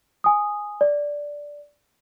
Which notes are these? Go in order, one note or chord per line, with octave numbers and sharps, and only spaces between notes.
G#5 D#6
D5